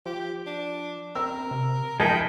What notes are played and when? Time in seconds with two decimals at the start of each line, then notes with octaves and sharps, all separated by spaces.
0.06 F3 G4
0.47 D4
1.15 C4 A#4 E6
1.51 C3
2.00 F3 G#3 D#4 E4 A#4 G5 A5